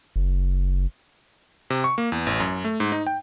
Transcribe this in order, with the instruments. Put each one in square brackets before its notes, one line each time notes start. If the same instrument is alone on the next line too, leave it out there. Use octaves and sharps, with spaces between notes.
[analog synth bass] F#1
[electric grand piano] C3
C#6
A#3
E2
A1
F#2
A3
G#2
D#4
G5